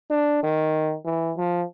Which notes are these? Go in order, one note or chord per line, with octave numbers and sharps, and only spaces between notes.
D4
D#3
E3
F3